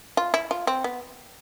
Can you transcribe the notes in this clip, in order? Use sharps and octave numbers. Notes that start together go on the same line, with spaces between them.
F4
E4
F4
C4
B3